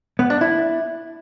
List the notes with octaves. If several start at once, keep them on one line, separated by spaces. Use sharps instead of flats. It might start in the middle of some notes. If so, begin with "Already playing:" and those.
B3
D4
E4